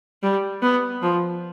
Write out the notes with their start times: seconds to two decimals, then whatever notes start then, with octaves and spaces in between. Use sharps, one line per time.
0.23 G3
0.62 B3
1.02 F3